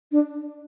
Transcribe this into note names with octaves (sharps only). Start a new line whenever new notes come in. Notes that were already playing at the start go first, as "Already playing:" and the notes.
D4